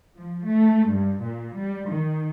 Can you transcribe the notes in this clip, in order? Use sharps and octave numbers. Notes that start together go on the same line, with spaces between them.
F3
A3
G2
A#2
G3
D#3